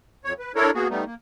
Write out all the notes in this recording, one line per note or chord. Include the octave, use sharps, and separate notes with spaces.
F2 C#5
B4
D4 E4 A4 A#4 C#5
A#3 B3 F#4 G#4
G3 A3 B3 D#4
A#3